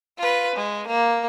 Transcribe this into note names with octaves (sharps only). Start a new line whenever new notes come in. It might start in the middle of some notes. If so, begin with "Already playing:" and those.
F4 B4
G#3
A#3